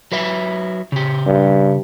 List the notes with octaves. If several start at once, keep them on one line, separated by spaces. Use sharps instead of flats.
F#3 B4 E5
C#3 G4
G2